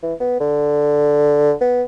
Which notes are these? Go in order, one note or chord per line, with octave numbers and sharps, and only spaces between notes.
E3
B3
D3
B3